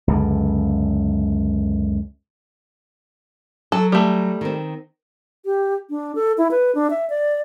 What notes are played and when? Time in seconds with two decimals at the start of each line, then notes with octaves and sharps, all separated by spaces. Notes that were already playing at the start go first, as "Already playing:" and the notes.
0.08 C#2 F#2 D3
3.72 F#3 A4
3.92 G3 A3
4.41 D#3 C4
5.45 G4
5.90 D4
6.15 A4
6.38 E4
6.51 B4
6.75 D4
6.90 E5
7.10 D5